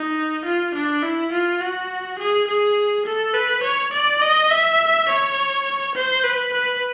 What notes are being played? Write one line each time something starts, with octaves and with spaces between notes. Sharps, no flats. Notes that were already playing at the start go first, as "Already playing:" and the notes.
Already playing: D#4
F4
D4
E4
F4
F#4
G#4
G#4
A4
B4
C#5
D5
D#5
E5
C#5
C5
B4
B4